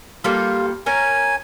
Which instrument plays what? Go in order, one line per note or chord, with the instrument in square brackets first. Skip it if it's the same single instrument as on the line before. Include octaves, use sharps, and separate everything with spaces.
[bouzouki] G3 A#3 A4 [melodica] F4
[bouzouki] C#4 A#4 [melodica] G#5